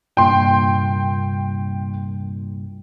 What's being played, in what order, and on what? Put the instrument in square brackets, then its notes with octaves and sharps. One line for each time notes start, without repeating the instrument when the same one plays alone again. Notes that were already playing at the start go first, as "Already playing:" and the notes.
[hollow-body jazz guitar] C2 G2 A#2 [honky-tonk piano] G5 C6